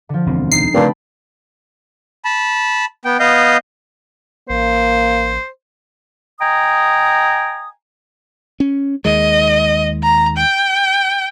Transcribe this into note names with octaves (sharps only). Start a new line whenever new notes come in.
D3 F3
E1 D2 C4
D#4 C7
G2 A#2 C#3 A3 C4 G5 A5 B5
A5 B5
B3 G5
B3 D#5 F5 G6
A1 A#3 C5
D#5 G5 G#5 A#5 D#6
C#4
D#2 D#3 G#3 D#5
A#5
G5